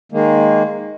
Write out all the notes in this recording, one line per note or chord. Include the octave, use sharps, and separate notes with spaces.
D#3 G#3 A#3